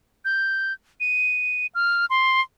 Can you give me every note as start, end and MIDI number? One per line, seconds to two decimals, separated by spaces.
0.25 0.73 91
1.00 1.66 99
1.75 2.05 89
2.10 2.41 84